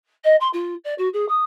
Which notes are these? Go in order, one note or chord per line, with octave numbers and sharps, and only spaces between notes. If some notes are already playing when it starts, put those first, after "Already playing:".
D#5
C6
F4
D5
F#4
G#4
D#6